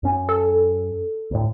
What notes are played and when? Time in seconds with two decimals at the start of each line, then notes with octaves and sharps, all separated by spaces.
0.03 F#2 C#4
0.29 A4
1.31 D2 A2